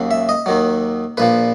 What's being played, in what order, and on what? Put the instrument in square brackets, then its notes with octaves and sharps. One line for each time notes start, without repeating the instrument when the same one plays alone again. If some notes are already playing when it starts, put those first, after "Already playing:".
Already playing: [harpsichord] D#2 C#3 F#3
E5
D#5
D#2 D#3 F#3
A#1 A#2 F3 B4